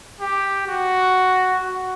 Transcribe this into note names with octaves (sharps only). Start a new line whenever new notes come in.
G4
F#4
F#4